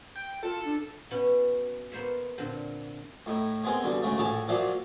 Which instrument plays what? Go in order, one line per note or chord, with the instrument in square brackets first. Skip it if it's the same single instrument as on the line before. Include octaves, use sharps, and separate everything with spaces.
[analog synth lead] G5
[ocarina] F4 [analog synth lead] A4
[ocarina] D4
[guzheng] B2 B3 C#4
A#3 B3 C5 C#5 E5
A#2 D3 C4
[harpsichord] A2 D#4 E4
G#3 B3 C4 G#4 A#4
G2 B2 D3
D2 G#2 C#3 A3
A#1 A2 G#4 A5 A#5
A#2 F3 F#3 D5 E5 F5